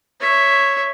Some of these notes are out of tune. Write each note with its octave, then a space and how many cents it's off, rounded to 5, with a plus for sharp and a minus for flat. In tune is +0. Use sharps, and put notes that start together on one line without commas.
C#5 +0 E5 +0